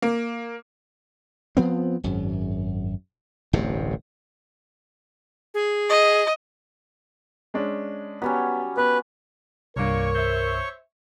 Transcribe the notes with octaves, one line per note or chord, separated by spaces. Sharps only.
A#3
F3 B3 C4
G#1 F#2
D1 A1 G2 C3
G#4
D#5
G#3 C#4 D4
F#3 G3 B3 C#4
B3 B4
C2 G2 A#2 A#3 A#4 C#5 C#6
C5 E5